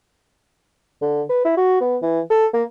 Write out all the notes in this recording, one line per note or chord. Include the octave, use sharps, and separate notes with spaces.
D3
B4
E4
F#4
B3
E3
A4
A#3